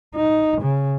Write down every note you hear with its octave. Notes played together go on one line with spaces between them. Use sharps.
D#4
C#3